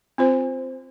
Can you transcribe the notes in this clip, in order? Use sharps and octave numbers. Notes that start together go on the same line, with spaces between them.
C4 F4 C5